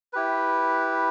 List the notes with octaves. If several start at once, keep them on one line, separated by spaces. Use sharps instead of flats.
E4 G4 B4